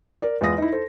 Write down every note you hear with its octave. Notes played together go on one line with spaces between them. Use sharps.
A#4 D5
E2 G#3 F4 D#6 A#6
D#4 E4
A4 C5